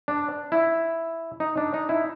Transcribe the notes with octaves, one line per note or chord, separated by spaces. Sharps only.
D4
E4
D#4
D4
D#4
E4